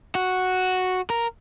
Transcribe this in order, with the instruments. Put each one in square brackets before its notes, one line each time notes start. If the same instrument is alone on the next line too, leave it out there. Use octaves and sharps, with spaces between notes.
[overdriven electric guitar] F#4
A#4